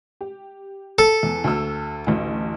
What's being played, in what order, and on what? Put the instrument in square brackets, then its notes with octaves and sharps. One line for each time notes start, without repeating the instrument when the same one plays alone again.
[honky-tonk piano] G4
[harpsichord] A4
[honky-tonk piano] E2
D2 E6
A1 D2